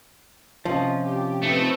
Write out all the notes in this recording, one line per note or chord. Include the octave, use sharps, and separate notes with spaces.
C3 F3 C#4 D#5
G4
A3 C4 D#4 B4